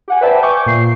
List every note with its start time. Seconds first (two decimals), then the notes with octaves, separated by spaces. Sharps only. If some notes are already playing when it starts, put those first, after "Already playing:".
0.08 G4 F#5 G#5
0.21 B4 C5 D5 E5 G5 A5
0.43 G#5 C#6 D6 G6
0.66 A#2 C7